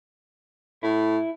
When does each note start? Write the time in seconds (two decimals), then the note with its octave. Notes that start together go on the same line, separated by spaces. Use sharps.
0.83 A2 E4